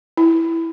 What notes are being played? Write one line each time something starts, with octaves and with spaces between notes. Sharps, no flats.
E4